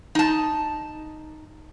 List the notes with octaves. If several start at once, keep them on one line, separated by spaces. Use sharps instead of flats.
D#4 A5